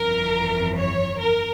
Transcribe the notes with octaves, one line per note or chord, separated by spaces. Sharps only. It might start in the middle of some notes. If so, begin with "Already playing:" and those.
Already playing: G1 F2 E3 A#4
C#5
A#4